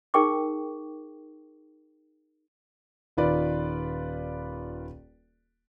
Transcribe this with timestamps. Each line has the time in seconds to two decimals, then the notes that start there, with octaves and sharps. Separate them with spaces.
0.14 D#4 G#4 A#4 G5 C#6 D6
3.17 D#1 D#3 F4 B4 D5